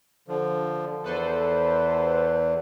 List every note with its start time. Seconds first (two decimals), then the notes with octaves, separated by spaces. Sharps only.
0.28 D3 F3
1.04 E2 A4 B4 C5